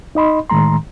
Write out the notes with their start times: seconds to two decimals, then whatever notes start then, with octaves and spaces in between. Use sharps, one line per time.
0.15 D#4 D#5 B5 C6
0.50 A2 D#3 G#3 A#5 C6